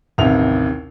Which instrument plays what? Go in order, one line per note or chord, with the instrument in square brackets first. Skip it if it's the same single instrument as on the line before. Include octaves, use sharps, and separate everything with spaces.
[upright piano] A1 D#2 C3 E4 F7